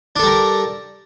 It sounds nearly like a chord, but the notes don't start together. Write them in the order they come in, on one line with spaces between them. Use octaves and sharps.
D4 A4 G3 A#4